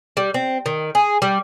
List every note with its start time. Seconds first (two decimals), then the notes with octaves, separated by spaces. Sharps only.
0.17 G3
0.34 C4
0.66 D#3
0.95 G#4
1.22 G3